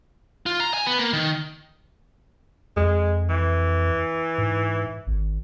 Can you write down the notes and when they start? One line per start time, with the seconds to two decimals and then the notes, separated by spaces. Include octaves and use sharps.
0.46 F4
0.60 A#5
0.74 G#5
0.86 B3
0.99 A#3
1.13 D#3
2.76 F2 G#3
3.29 E3
4.38 G#2
5.07 G#1